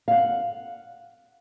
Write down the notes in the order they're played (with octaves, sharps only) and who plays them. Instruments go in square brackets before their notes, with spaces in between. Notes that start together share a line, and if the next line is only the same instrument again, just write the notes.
[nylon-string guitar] F5 F#5